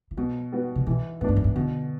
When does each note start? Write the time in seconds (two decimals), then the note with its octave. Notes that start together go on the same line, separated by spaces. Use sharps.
0.11 E3
0.17 B2 F#3
0.52 G3 B3 F#4
0.75 C3
0.87 B2 E3
1.21 A2 B3
1.24 G2 D4
1.36 F#2
1.44 G2
1.56 B2 D3